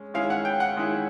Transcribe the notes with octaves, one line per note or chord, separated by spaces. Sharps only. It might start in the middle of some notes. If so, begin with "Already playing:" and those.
Already playing: G#3 C#4
D#3 G#3 C#4 E4 F5
F#5
G5
F#5
D#3 G#3 C#4 E4